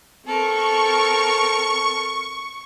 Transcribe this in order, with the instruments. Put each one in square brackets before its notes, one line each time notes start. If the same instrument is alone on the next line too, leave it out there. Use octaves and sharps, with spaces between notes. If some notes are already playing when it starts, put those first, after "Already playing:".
[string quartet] C4 A4 A#4 [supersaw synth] C#6